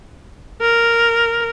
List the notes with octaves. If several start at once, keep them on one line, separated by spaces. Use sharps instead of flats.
A#4